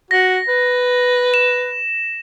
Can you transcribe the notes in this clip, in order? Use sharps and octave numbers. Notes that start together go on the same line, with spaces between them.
F#4 A#6
B4
E7